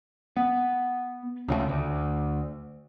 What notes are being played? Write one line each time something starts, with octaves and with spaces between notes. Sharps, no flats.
B3
C#2 C#3 E3 A3
D2